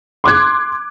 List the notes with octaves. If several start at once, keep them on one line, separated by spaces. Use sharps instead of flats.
C6 D6 F#6 G#6